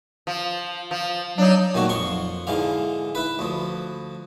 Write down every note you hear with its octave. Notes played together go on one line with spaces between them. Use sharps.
F3
F3
F#3 D4 D#4
A#2 D#3 A3 F#4
F2 C6 C#6
G#2 D3 E3 F5
E4 B4
D2 F3